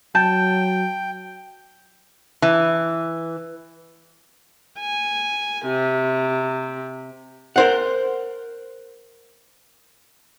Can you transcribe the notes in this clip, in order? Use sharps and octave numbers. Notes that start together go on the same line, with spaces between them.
F#3 G5 A5 G6
E3
G#5
C3
A#4 C5 F#5